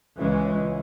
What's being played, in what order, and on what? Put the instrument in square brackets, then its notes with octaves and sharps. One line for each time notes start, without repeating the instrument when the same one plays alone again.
[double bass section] C#2 C#3 E3 G#3 C#4